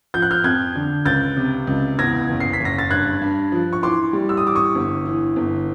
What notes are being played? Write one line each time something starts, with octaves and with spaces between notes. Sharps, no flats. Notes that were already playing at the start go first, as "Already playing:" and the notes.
F3 G6
F#6
F6 G6
F2 F#6 G#6
D3
C#2 G6 A6
C3
C#2
E2 G#6 A#6
F#1
C7
B6
F#1 A#6
A6
G2 F#6 G#6
G2
F3
C#6
E3 C6 D6
G3
E6
D#6
E3 D6
C#6 D#6
G1
E3
G1